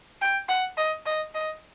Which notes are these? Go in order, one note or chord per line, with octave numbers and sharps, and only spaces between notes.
G5
F#5
D#5
D#5
D#5